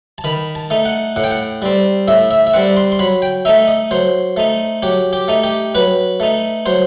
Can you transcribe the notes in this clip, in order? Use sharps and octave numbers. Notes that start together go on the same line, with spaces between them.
A5
D#3 B5
A5
A3 D#4
F#5
A2 F#5
G5
F#5
G3 C4
A2 E5
E5
E5
G3 C4 F#5
C6
C6
F#3 B5
G5
A3 D#4 E5
D#5
F#3 C5
A3 D#4
F#3 G4
G4
A3 D#4
G4
F#3 B4
A3 D#4
F#3 C5